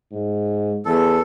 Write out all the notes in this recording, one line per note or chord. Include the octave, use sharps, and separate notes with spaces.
G#2
E2 A4